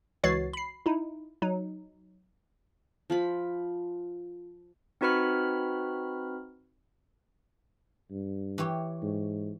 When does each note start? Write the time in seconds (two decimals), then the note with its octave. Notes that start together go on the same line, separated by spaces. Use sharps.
0.23 C#2 E3 F#4 C#5 A6 C7
0.53 B5 C7
0.86 D#4 E4
1.42 F#3 D#4
3.10 F3 F4 B5
5.01 C4 D#4 F#4 B4 B5 F6
8.11 G2
8.58 E3 G4 C#5
9.02 G#2